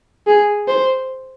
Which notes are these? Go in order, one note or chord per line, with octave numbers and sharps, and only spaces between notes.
G#4
C5